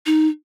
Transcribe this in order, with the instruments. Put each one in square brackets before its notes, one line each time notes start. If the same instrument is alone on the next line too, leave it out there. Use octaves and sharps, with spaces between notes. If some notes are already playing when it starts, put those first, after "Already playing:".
[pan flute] D#4